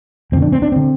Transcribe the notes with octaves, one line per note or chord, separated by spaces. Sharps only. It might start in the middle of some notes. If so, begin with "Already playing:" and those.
F2 D3 C4
D4
C4
D4
D3 C4